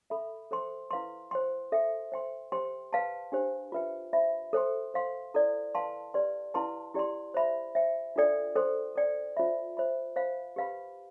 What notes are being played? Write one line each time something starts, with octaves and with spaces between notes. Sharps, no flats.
A4 E5 B5
A4 C5 G5 C6
E4 B4 F5 C6
C5 G5 C6
A4 E5 G5
C5 G5 C6
G4 C5 G5 C6
B4 F5 A5 C6
D4 G4 C5
F4 B4 E5 G5
C5 E5 B5
A4 C5 G5 C6
C5 F5 C6
E4 A4 D5
B4 F5 A5 C6
G4 B4 D5 G5 C6
E4 B4 F5 A5 C6
E4 G4 D5 G5 C6
C5 E5 B5
C5 E5 G5
D4 F4 A4 D5 G5
A4 C5 G5 C6
A4 D5 G5
F4 C5 E5 B5
C5 E5 B5
C5 F5 B5
G4 B4 F5 B5